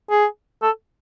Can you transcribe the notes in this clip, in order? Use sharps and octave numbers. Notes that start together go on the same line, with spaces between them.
G#4
A4